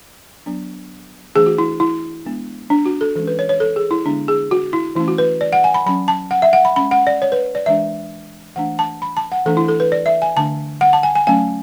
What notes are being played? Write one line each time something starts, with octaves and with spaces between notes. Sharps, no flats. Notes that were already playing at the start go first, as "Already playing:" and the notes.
F#3 B3 D4
E3 A3 D4 G#4
F#4
E4
E4
G#3 B3 D4
D4
F#4
A4
E3 G#3 C#4 A4
B4
C#5
C#5
A4
G#4
E4
D3 G#3 B3 D4
G#4
F#4
E4
E3 A3 C#4 E4
F#4
B4
D5
F#5
G#5
B5
F#3 C#4 B5
A5
F#5
E5
F#5
B5
G#3 C#4 B5
F#5
D5
C#5
B4
D5
E3 G#3 D4 E5
E3 A3 D4 F#5
A5
B5
A5
F#5
E3 A3 D4 A4
E4
A4
B4
D5
E5
G#5
D3 A3 D4 A5
F#5
A5
G#5
G#5
F#3 A3 C#4 G#5